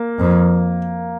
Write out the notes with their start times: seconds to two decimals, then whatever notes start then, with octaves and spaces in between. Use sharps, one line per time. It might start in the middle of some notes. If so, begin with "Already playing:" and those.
Already playing: A#3
0.19 F2